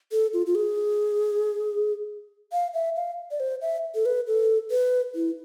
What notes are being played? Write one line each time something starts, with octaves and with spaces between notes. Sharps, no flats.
A4
F4
F4
G#4
F5
E5
F5
D5
C5
E5
A4
B4
A4
B4
E4